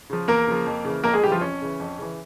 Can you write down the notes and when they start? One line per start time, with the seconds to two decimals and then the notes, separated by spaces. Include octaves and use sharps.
0.10 C#3 F3
0.28 E2 A#3 A#4
0.48 C#3 F3
0.66 F2
0.85 C#3 E3
1.04 F2 A#3 A#4
1.13 G#3 G#4
1.23 C#3 E3 G3 G4
1.32 F3 F4
1.41 F2 C#4
1.61 C#3 E3
1.80 F2
1.98 C#3 E3